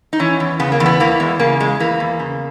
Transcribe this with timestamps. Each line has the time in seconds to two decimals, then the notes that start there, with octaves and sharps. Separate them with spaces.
0.13 D#4
0.19 E3 C#4
0.40 E2
0.60 C#3 B3
0.72 A#3
0.80 E2
0.86 B3
1.00 E3 A#3
1.20 E2 G#3
1.39 C#3 A#3
1.60 E2 G#3
1.80 E3 A#3
2.00 E2
2.20 C#3